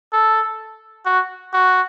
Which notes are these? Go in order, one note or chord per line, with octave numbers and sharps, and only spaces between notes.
A4
F#4
F#4